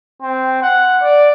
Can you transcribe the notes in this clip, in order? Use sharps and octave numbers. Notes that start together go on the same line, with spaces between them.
C4
F#5
D5